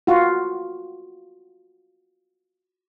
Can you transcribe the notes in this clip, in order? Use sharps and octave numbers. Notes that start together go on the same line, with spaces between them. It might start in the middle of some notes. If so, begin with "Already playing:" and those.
F4 F#4